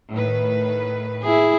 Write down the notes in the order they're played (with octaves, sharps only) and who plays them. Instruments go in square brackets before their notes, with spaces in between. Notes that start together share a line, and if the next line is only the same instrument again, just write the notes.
[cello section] A2 D#3 B4
[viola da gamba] E4 G#4